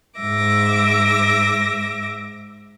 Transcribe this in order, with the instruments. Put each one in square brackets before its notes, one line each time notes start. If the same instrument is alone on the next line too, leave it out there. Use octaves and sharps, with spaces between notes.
[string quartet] G#2 E5 D6 A#6